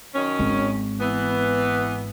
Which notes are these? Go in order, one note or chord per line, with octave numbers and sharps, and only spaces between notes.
F#2 D#3 C#4
G#1
E3 B3